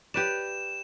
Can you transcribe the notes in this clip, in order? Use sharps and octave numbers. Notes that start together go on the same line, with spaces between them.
G4 B4 D5 E7